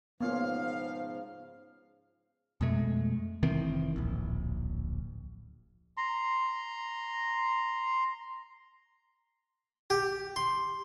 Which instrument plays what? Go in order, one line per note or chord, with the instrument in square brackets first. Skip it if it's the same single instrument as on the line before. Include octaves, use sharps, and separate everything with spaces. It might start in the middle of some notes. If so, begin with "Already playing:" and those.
[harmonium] G#2 C#3 F3 [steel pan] A#3 C#4 F4 [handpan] B3 [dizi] F5
[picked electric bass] F2 B2 G#3 A3
F1 D#3 E3 C4
D1 A#1
[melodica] A#5 C6
[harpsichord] G4
C6